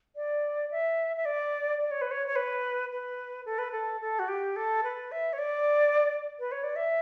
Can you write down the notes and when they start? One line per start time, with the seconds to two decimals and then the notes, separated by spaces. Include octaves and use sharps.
0.16 D5
0.71 E5
1.17 E5
1.25 D5
1.81 D5
1.91 C#5
2.02 B4
2.11 C#5
2.27 C#5
2.36 B4
2.92 B4
3.46 A4
3.58 B4
3.72 A4
4.01 A4
4.19 F#4
4.28 G4
4.56 A4
4.84 B4
5.12 E5
5.33 C#5
5.38 D5
6.40 B4
6.52 C#5
6.64 D5
6.76 E5